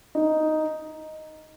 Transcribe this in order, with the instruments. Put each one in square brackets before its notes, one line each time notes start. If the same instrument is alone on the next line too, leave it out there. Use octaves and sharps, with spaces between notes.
[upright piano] D#4